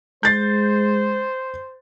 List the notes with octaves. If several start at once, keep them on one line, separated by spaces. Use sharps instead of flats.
G#3 C5 G6 A6 C7